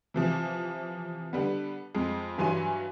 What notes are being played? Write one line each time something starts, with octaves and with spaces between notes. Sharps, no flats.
C3 E3 F3
D3 G3 B3
F2 G#3
G2 E3 F#3 G#5 C6 D#7